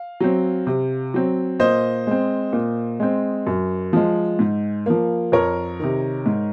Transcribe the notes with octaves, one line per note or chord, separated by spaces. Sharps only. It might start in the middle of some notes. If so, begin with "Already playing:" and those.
Already playing: F5
F#3 C4
C3
F#3 C4
A#2 C5 D#5
G#3 C4
A#2
G#3 C4
F#2
F3 G#3
G#2
F3 A#3
F2 A#4 C#5
C3 D#3
G#2